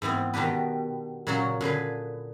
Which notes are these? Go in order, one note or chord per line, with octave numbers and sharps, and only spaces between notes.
G#2 E3 B3 C4
B2 D#3 D4 G4 B4
A#2 C#3 F#3 A#3 F#4
A#2 D3 G#4 B4